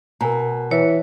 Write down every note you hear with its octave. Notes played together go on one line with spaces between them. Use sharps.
B2 A#4 G#5 A#5
E3 C#5